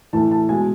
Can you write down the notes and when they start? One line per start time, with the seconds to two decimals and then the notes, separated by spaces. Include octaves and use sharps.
0.13 A2 E3 A3 A5
0.31 A5
0.49 B2 G#3 G#5